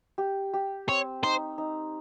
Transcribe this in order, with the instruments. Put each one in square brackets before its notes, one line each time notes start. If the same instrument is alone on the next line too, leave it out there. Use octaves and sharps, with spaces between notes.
[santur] G4
G4
[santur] C4 [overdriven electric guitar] C#5
[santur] D#4 [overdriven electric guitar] C5
[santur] D#4